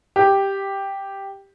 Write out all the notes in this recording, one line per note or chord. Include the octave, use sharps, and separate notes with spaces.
G4